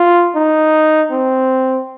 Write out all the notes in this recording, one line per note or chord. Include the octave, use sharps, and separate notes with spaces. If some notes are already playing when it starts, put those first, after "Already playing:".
Already playing: F4
D#4
C4